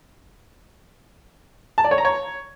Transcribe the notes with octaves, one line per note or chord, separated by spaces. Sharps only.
A5
D5
C#5
A#5
C#5